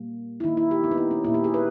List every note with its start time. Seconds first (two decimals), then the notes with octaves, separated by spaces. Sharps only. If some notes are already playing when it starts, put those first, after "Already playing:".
Already playing: A#2 G3 A#3
0.40 E4
0.44 D#3 A#3 D#4
0.57 E4
0.71 G4
0.84 B3
0.91 D#4
0.98 E4
1.11 C#4
1.24 A#2 A#3 E4
1.34 G4
1.44 G#4
1.54 B4